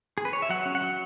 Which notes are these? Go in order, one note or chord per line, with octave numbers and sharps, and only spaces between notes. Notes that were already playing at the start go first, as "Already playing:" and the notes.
G#4
B4
C#5
E5
F#3 F#5
C#4
F#5
F#3